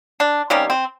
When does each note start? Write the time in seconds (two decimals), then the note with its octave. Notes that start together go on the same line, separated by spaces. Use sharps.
0.20 D4
0.50 C3 D#3 G3 A#3 C#4
0.70 C4